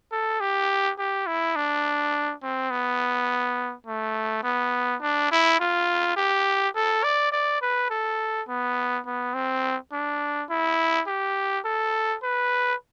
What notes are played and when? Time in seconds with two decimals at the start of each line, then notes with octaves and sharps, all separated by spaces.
0.12 A4
0.41 G4
0.98 G4
1.27 E4
1.56 D4
2.42 C4
2.71 B3
3.87 A3
4.44 B3
5.01 D4
5.31 E4
5.60 F4
6.17 G4
6.75 A4
7.04 D5
7.32 D5
7.62 B4
7.90 A4
8.48 B3
9.06 B3
9.34 C4
9.92 D4
10.50 E4
11.07 G4
11.65 A4
12.23 B4